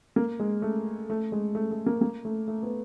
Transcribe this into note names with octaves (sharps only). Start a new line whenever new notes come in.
A#3
G#3
A3
A3
G#3
A3
A3
A#3
A#3
A3
A3
B3